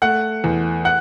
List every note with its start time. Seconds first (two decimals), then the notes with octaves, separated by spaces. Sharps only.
0.02 A3 F#5 F#6
0.44 E2
0.85 F#5 F#6